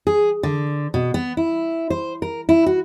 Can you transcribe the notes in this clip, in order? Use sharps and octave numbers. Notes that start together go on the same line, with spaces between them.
G#4
D3
B2
B3
E4
C5
A#4
E4
F#4